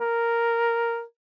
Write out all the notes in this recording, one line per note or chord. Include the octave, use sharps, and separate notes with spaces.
A#4